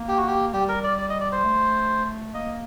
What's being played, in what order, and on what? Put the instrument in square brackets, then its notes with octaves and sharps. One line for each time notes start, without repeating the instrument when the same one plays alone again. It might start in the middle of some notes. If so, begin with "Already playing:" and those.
Already playing: [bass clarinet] A#3
[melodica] G4
F#4
G4
[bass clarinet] G3 [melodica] G4
[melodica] A#4
D5
D5
D#5
D5
C5
[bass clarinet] A3
[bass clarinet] A#3 [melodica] D#5